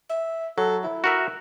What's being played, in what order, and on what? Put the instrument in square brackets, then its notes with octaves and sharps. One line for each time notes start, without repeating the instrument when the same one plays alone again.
[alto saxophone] E5
[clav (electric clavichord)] F#3 [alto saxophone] A4
[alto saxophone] E4
[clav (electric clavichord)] F#4 A#4 E5